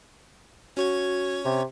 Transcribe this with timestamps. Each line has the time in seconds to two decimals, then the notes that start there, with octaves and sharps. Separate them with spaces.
0.77 C#4 F#4 C#5 G#6
1.45 C3